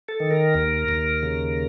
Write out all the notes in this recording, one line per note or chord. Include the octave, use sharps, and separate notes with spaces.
A4
D#3
A#4
D#2
D#2
C#3